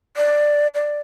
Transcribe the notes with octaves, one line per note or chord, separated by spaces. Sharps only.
D5
D5